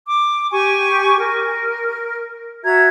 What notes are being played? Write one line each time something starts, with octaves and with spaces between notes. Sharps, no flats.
D6
G4 G#5 C#6
A#4
F#4 E5 A#5 G#6